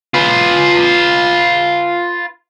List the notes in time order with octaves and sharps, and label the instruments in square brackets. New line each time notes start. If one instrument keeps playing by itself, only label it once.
[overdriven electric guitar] F4 B4